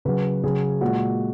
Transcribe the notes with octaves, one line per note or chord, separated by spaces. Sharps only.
C#3 F#3 B4
C#3 F#3 G#4
A#2 G#3 F#4